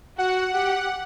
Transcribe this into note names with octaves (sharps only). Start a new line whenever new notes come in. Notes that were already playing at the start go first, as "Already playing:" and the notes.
F#4 F#5
G4 F#5